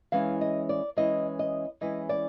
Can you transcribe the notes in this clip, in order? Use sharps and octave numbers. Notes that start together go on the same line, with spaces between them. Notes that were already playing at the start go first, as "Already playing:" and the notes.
E3 G#3 C#4 E4 F5
D#5
D5
E3 G#3 C#4 E4 D#5
D#5
E3 G#3 C#4 E4 D#5
D5